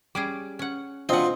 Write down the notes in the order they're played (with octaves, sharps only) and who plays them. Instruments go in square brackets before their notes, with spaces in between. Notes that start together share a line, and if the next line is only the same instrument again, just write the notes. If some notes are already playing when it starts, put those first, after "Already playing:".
[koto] G3 C#4 G#4 [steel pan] D6
[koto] C#4 F#5
[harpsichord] B2 F4 [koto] C4 F#5 [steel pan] D4 C5 D#5